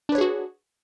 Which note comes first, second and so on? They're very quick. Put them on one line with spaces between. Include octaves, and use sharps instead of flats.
D4 B4 C#5 G#4 F#4